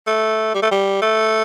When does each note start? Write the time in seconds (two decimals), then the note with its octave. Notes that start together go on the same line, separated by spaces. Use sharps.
0.07 A3
0.54 G3
0.62 A3
0.71 G3
1.02 A3